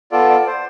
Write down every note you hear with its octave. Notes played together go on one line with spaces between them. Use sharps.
B3 F4 A4 D5
D5
C5